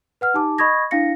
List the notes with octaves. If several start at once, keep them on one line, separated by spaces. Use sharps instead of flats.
B4 F#5 F6
D#4 G4 A5 D6
D#5 B5 C#6 D#6 G#6 A#6
D4 E4 F5 A#6 C#7